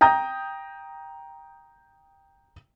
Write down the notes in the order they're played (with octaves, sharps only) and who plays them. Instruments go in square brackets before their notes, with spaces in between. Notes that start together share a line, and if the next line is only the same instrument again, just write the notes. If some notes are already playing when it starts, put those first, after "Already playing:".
[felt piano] G5 A#5 D#6 G6